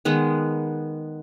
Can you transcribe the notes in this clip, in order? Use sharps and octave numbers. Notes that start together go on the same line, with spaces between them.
D#3 G#3 B3